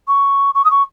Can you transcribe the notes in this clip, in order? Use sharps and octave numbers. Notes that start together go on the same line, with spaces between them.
C#6
C#6
D#6
C#6